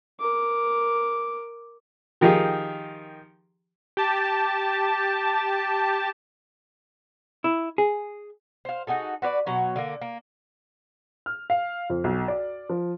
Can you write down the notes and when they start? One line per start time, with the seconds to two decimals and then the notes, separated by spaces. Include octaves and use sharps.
0.20 A#4 D6
2.21 D#3 F3 D#4 G4 G#4
3.97 G4 A5
7.44 E4
7.78 G#4
8.65 C5 F5
8.87 D#4 F#4 G#4 A4
9.22 F#4 B4 C#5 D5
9.46 B2 F#3 C#5
9.76 D3 A#3
10.02 A#3
11.26 F6
11.50 F5
11.90 F2
12.04 B1
12.28 D5
12.70 F3